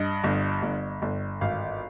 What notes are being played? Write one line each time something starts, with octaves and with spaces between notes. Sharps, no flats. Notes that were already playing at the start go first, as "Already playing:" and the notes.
Already playing: G2 D#5
G1
G1
G1
G#1 F5